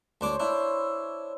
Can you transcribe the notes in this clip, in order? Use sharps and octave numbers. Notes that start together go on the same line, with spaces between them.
D2 D4 C5 C#5 D6
D4 E4